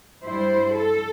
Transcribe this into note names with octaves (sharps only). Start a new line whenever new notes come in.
G2 G3 E4 C5
A4